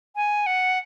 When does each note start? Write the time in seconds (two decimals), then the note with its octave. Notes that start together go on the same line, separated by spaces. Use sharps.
0.16 G#5
0.46 F#5